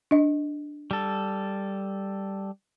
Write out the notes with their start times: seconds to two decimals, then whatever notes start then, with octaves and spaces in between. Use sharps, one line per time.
0.11 D4 D#5
0.91 G3 A4